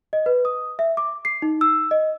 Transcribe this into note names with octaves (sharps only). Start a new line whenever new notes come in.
D#5
B4
D#6
E5
D6
C7
D#4
E6
D#5